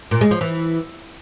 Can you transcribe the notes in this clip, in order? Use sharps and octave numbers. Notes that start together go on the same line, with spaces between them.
A#2
G#3
F3
E3